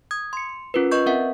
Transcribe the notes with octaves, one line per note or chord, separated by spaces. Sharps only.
D#6 G#6
C6 C#7
C#4 F4 A#4 B4
B4 D#5 C#6 G6
C4 A#4 E5 F#5